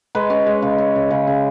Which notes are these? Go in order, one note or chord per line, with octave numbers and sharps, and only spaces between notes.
G#3 B4
C#4
G#3
C#3
C#4
C#3
C#3
C#3